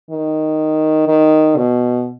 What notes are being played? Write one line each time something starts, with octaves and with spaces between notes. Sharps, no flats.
D#3
D#3
B2